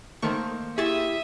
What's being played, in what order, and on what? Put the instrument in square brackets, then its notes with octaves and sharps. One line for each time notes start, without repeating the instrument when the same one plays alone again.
[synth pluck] D#3 A3 C#6 [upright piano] A#3 A4 C5
[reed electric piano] E4 G4 [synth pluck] G#4 C#6 A6 [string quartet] E5 D#6